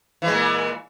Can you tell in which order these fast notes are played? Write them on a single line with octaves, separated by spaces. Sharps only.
E3 G#3 A#2